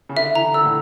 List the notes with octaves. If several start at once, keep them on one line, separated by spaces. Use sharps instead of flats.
C#3
D3 E5
E3 A#5
D3 E6
A2